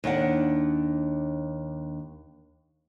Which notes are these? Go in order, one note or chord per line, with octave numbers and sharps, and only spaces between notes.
D#2 D4 F#5